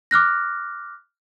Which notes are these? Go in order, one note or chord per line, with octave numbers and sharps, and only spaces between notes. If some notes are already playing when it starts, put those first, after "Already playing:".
D6 F6 F#6 A#6